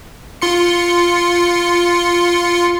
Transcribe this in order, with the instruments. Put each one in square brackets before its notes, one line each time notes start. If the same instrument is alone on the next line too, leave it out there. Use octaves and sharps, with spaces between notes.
[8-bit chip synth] F4 C6 C#7